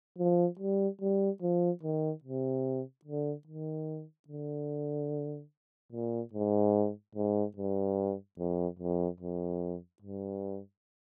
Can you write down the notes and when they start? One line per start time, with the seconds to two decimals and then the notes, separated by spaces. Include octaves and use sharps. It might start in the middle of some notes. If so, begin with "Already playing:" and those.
0.18 F3
0.59 G3
1.01 G3
1.42 F3
1.83 D#3
2.24 C3
3.05 D3
3.47 D#3
4.28 D3
5.92 A#2
6.33 G#2
7.15 G#2
7.57 G2
8.39 F2
8.79 F2
9.20 F2
10.02 G2